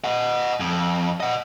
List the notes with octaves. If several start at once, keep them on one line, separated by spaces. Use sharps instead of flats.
D#5 F#5
F2
D#5 F#5